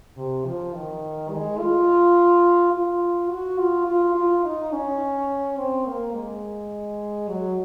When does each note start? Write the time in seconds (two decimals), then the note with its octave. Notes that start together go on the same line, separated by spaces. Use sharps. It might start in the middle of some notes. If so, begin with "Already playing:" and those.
0.17 C3
0.45 F3
0.74 D#3
1.31 G#3
1.59 F4
2.73 F4
3.30 F#4
3.58 F4
3.87 F4
4.15 F4
4.44 D#4
4.72 C#4
5.57 C4
5.86 A#3
6.14 G#3
7.28 F#3